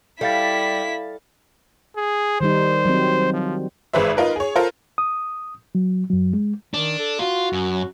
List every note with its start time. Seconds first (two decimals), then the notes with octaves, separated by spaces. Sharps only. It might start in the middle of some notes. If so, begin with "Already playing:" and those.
0.21 G3 E4 A4 F5 A6 B6
1.96 G#4
2.41 D#3 G3 D#4 C5
2.86 F#3 C4
3.34 F3
3.94 G#1 G#3 B4 C5 E5
4.17 D#4 F4 A#4 B4
4.36 G#4 C#5
4.56 F4 A4 A#4 C5
4.98 D#6
5.75 F#3
6.10 F#2 F#3
6.34 G#3
6.74 D#3 D4
6.99 A4
7.19 F4 F#4
7.53 F#2